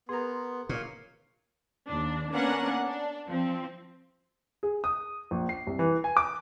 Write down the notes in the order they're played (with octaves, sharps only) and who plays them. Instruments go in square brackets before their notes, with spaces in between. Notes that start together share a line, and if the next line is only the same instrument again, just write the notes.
[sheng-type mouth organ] B3 [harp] G#4 A#4 [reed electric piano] C6
[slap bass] A#2 [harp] C#5 F5
[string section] D#2 D4
A#3 B3 C#4 D4 A#4 F#5
D4
F3 C4
[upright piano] G#4
D#6
A#1
C7
C2
E3
G#5
D6